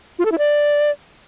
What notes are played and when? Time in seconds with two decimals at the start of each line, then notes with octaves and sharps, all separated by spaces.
0.19 F4
0.25 A4
0.32 E4
0.38 D5